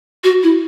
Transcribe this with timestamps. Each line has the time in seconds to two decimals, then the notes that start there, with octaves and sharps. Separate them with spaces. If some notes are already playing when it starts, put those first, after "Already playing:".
0.24 F#4
0.43 E4